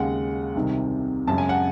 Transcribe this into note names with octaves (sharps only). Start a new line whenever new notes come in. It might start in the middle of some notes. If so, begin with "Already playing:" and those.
Already playing: D#2 C#3 G#3 F#5
C2 C3 D#3
F#2 C#3 G#3 A5
G#5
F#5